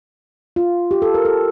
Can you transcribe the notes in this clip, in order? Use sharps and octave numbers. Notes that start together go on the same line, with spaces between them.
F4
G4
A4
A#4
A4